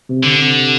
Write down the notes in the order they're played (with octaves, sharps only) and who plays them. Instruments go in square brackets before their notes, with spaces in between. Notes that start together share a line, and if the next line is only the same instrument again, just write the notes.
[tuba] C3
[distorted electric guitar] D3
[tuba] C3